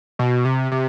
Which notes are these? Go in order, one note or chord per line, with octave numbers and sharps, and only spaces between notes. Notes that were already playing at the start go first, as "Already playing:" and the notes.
B2
C3
C3